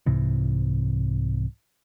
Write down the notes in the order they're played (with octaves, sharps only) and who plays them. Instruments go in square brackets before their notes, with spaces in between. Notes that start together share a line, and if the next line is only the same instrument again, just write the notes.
[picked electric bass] C2 G#2 C3 E3